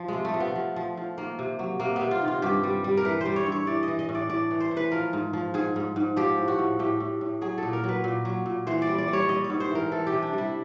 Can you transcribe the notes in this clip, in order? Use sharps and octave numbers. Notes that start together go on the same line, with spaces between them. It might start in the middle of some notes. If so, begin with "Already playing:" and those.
Already playing: F3
C3 G#3
A3
F3
B3
F3
F3
F3
D#3 A#3
C3
F#3
C3 A#3
B3
C3
F4
D#3
F4
G2 G4
G3
G3
A#4
E3 B4
G3 C5
C#5
G2
C#5
E3 D5
E3 D#5
D#5
A2
D5
A2 D5
E3
C5
E3
B4
F3 A#4
G#2
F3
G#2 G#4
G#2
G#2
F3 G4
A2
F#4
A2
A2 G4
A2
A2
F#3 G#4
A#2 A4
A#4
F#3 B4
A#2
F#3
A#2
E3 C5
D5
G3
D5
G3
C#5
G3 D#5
C#5
G#2
C5
E3 A#4
E3 A4
G4
C3
D4
G3 E4